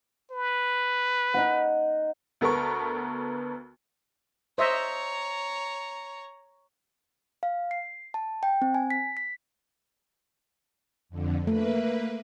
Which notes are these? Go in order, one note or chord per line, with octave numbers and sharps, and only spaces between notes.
B4
D#4 D#5 F#5
D2 B3 A4 A#4 C#6
C5 C#5 D#5 E5 A#5
F5
C7
A5
G5
C4
G#5
B6
B6
F2 D3
A3 A#3 B4